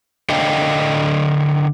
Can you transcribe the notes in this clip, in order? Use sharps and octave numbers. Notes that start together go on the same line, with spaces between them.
D3 D4 D#5 F5 G5